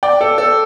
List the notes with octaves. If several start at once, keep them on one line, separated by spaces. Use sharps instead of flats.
D5 G5
A4 D5
A4